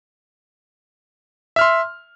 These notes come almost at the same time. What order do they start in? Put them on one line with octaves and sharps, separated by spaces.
E5 F6 C6